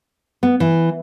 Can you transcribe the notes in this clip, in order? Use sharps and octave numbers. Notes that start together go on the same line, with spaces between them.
B3
E3